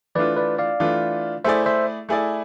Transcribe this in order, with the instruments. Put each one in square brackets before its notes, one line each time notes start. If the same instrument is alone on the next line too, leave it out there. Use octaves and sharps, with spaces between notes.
[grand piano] E3 A3 D4 F4 [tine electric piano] B4 D5
[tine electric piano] B4 D5
D5 F5
[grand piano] E3 A3 D4 F4
[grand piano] A3 E4 G#4 D5 [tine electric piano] C5 E5
[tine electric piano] C5 E5
[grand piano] A3 E4 G#4 D5